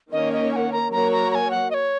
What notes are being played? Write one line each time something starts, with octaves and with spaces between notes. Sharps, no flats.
D#3 A#3 C#4 A#4 C#5 D#5
D#5
G#5
F#5
A#5
F#3 A#3 F#4 A#4 C#5 A#5
A#5
A#5
G#5
F#5
D#5
C#5